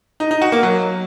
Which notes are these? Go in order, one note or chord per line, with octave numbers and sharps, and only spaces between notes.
D#4
D#4
F#4
A#3
F#3